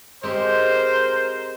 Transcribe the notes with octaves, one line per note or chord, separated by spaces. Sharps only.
G#3 C4 G4 A#4 C5